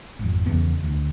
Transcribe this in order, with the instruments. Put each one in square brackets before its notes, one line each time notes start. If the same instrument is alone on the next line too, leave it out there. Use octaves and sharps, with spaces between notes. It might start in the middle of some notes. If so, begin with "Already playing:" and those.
[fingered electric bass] G#1 F2
E2 C#3 B3
D2